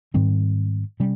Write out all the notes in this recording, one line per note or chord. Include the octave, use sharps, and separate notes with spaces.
G#2 D#3 G3 C4
C3 G3 C#4